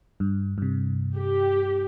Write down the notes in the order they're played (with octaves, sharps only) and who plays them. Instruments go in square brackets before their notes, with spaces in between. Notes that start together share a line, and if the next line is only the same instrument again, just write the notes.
[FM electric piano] G2
G2 C3
[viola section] G4